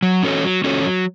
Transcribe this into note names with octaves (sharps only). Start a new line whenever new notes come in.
F#3
C#4 F#4 A4 C#5
F#3
C#4 F#4 A4 C#5
F#3